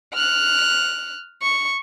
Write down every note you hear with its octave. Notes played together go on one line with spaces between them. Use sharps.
F6 F#6
C#6